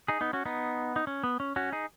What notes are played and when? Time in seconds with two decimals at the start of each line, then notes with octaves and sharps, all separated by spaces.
0.08 D#4 G#4
0.21 B3 D#4
0.33 C#4 F#4
0.45 B3 D#4
0.96 D#4
1.07 C#4
1.24 B3
1.40 C#4
1.56 C#4 F#4
1.72 D#4 G#4